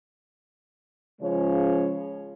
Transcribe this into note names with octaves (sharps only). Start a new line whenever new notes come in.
C#3 F3 G#3 C#4 C#5